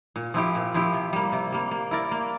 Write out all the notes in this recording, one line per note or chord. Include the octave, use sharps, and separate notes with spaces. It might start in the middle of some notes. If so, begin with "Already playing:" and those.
A#2
F3 C4 E4 G4
A#2
F3 C4 E4 G4
C3
G3 A#3
C3
G3 A#3
A#3
E4 A#4 D5
A#3